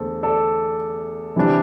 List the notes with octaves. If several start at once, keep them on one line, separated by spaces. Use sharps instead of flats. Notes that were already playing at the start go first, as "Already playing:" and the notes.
Already playing: E2 D3 A3 A4 C5
A4 D5
C3 E3 G3 D4